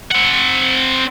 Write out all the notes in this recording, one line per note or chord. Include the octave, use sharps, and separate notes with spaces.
C4 F#5